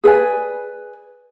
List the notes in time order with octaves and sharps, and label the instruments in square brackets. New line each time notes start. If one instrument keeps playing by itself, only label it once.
[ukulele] G#4 B4 D5 G#5